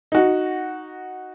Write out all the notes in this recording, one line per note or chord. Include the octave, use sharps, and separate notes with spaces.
D#4 F#4